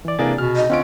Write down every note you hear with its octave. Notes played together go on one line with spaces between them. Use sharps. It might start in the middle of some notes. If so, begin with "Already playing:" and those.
E3 D5
C3 E3 A#3 D4 G#4 A6
B2 F6
D#5
D3 C4 C#4 F4 D7